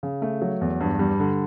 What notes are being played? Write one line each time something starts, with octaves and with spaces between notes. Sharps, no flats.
C#3
A3
F#3
E2
G2
G3
D3